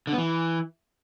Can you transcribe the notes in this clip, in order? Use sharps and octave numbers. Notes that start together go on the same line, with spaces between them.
D3
B3
E3